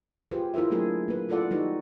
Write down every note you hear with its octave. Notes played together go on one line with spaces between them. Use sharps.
F4 G4 G#4 B4 C5
E4 F4 A#4 C5 E5
F#3 A3 A#3 D4 G#4 A#4
A#3 B4
E4 F4 A4 D5 F#5
G3 D#4 F#4 B4